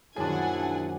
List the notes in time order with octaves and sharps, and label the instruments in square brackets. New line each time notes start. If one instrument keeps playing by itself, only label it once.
[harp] A#1 F#2 D#3 [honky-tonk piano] D4 G#4 [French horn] E4 [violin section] F#5 G#5